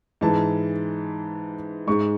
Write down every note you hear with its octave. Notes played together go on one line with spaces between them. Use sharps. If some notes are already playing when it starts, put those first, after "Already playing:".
G#2 E3 G#3 A5
G#2 G#3 C#6